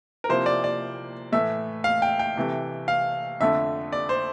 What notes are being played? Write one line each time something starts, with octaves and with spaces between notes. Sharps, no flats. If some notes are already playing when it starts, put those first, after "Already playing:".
A#4
C3 F3 A#3 E4 C5
D5
D5
A2 E3 A3 E5
F5
G5
G5
C3 E3 A3
F5
F2 D3 A3 E5
D5
C5